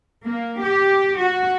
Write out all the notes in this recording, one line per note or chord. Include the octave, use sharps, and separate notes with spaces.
A#3
G4
F#4